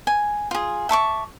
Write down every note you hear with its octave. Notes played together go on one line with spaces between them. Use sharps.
G#5
F4 G#4
E5 A5 C#6 D6